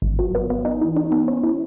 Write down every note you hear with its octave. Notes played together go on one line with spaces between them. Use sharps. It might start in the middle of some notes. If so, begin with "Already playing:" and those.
G#1
F#3
B3
B3
D#4
E3
D#4
B3
C#4
E4